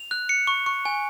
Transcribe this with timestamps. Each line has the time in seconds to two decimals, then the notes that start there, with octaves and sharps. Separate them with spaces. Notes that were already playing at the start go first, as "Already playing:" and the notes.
Already playing: F7
0.11 F#6
0.29 C#7
0.47 C#6
0.66 C#6
0.85 G#5